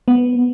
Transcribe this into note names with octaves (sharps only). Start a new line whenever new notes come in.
B3